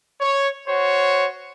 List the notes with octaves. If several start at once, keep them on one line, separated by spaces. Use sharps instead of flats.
C#5
F#4 C5 C#5